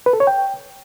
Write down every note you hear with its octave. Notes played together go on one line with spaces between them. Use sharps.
B4
A4
C#5
G5